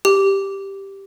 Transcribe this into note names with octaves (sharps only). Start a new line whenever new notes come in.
G4